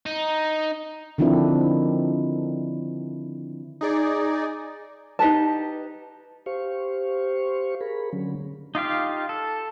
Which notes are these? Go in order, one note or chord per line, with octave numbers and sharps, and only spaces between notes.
D#4
D3 D#3 F3 C4 D4 E4
D#4 G#4 D5
D#4 G4 B4 A5
G4 C5 F5 C#6
G#4 A#4 B5
D3 F#3 C#4
D#4 F4 G4 F5
A4